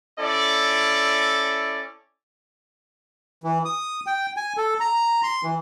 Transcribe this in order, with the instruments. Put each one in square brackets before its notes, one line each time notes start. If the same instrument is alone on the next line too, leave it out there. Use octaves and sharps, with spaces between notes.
[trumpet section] C#4 E4 A4 D5
[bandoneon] E3
D#6
G5
G#5
A4
A#5
C6
E3